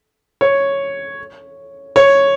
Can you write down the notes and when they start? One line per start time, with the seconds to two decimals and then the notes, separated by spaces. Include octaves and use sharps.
0.41 C#5
1.96 C#5